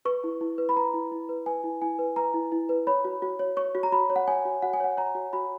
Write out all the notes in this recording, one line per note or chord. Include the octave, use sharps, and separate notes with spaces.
B4 C#6
E4
E4
B4
B5
B4 A#5
E4
E4
B4
B4 G#5
E4
E4 G#5
B4
B4 A#5
E4
E4
B4
C#5 B5
F#4
F#4
C#5
C#5 C#6
F#4
A#5
F#4 B5
C#5
F#5
C#5 G#5
F#4
F#4 F#5
G#5
C#5 F#5
C#5 A#5
F#4
F#4 B5